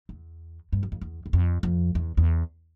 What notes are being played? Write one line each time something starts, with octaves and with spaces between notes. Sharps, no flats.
E2
G2
F#2
F2
E2
E2
F2
F2
E2
E2